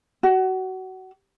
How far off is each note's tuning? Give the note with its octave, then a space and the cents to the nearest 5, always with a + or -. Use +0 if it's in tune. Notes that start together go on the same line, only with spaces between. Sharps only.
F#4 +25